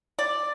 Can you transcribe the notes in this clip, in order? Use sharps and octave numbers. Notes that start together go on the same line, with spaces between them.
D5